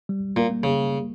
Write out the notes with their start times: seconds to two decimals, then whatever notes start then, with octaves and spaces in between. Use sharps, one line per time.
0.09 G3
0.36 A#2
0.50 A#3
0.63 C#3